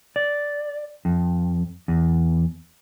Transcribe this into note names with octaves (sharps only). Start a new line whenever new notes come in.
D5
F2
E2